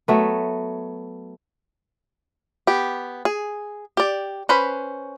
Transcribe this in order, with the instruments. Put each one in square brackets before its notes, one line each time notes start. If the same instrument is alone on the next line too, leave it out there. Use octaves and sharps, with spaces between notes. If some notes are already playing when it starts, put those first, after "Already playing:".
[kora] F#3 A3 B3
[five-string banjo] B3 G4
G#4
G4 D5
C#4 B4 C5 B5